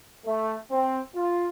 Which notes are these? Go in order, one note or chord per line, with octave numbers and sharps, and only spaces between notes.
A3
C4
F4